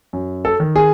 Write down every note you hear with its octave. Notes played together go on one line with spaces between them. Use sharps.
F#2
A4
D#3
G#4